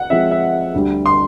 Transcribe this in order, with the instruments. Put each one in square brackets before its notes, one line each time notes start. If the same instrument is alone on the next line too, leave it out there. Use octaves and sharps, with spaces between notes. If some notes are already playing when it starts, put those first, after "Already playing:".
Already playing: [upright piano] F#5
[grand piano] F3 G#3 C4 [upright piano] E5
[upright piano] E5
[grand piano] D2 D3 G3
[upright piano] C6